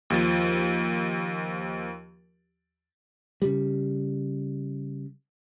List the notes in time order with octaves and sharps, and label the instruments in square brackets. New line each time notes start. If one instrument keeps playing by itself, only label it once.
[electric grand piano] D#2 F3 A6
[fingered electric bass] C#3 G3